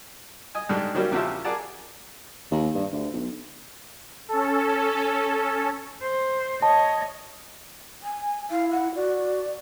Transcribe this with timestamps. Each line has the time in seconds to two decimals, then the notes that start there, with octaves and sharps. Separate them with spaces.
0.55 D#5 G#5
0.69 G#2 D3 G3 G#3
0.95 D#3 F#3 G3 A#3 C#4
1.12 E2 C#3 F3 F#4 G4 E5
1.45 G#4 A#4 D5 F#5 A5
2.51 D#2
2.75 G2
2.92 D2
3.13 B1
4.29 C#4 A4
6.01 C5
6.62 C#5 D#5 A5
8.03 G#5
8.51 E4 F5
8.71 F#5
8.95 F#4 D5